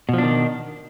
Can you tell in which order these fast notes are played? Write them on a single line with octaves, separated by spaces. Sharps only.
B2 F3 D4 D#3